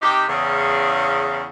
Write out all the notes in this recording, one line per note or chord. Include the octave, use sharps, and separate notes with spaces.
C3 D#4 G4
E2 C#3